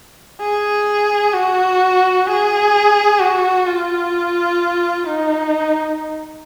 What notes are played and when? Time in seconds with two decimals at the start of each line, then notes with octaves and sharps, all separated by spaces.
0.41 G#4
1.34 F#4
2.27 G#4
3.20 F#4
3.67 F4
5.06 D#4